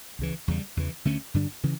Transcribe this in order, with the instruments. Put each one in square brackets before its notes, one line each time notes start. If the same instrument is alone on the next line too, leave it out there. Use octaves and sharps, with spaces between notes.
[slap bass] C#2 C#3 E3
E2 C#3 G3
E2 C#3 E3
D2 D3 A3 C#4
G2 D3 G3 D4
C#3 E3